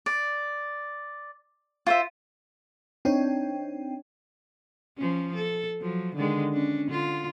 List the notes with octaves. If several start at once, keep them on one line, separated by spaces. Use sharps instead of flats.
D5
F4 C5 E5
C4 D4 D#4 C#5 G5
F3 C#4
A4
F3 F#3
D3 D#3 G#3
C#4 D4
D3 F4